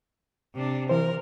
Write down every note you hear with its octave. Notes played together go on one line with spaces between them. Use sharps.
C3 D4
E3 A#4 C5